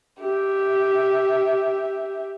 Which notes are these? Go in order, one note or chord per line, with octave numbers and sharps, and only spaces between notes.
G4 E5